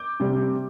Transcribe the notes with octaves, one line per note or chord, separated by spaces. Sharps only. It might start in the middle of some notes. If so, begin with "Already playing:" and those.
Already playing: D6 G6
C3 G3